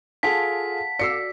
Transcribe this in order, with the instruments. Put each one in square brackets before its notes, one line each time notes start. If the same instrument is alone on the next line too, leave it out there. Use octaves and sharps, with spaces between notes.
[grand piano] F4 G#4 A4 [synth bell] F5 F#5 A5 [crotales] B6
[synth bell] F#4 D5 [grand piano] E6 C7 C#7